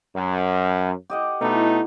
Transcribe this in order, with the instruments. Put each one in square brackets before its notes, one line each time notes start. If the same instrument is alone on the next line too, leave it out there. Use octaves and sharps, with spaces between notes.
[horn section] F#2
[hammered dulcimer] G4 D#5 F#5
[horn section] B2 A3 D#4 [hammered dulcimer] E4 F#5